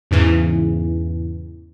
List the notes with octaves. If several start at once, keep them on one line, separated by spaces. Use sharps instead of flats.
E2 G#2 C#3 E3